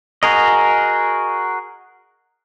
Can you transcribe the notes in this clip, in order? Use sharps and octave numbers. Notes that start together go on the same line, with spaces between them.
F#4 G#4 A#4 D#5